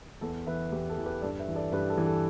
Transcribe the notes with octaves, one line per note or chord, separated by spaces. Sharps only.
E2 A4
E3 B4 E5
E2 G4
A4
E3
G4 B4
G2 A4 D5
B4 E5
E3
A4 D5
G2 G4 B4
A4
E3
A4